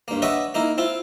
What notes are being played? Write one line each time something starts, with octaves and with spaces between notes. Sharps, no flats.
G2 A#3
D4 B4 C#5 D#5 E5 F#5
A#3 D#4 E4 A#4
C4 E4 F4